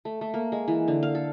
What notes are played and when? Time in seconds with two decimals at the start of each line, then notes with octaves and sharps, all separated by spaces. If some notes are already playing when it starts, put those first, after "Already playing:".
0.05 A3
0.21 A3
0.34 A#3
0.52 G#3
0.68 E3
0.88 D3
1.03 F5
1.15 A4